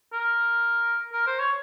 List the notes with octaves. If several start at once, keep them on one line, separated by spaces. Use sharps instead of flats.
A#4
A#4
C5
C#5